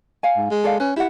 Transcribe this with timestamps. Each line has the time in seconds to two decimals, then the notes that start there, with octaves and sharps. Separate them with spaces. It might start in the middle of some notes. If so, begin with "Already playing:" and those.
0.23 F5 G#5
0.37 G#2
0.51 G#3
0.64 A4 D5 F5
0.80 C#4 B4
0.96 E4 G4 F#5